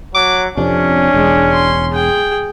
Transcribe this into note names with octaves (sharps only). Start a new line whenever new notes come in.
F#3 D6
F2 C3 C#4 D4
E1 G#3
C6
G#4 G5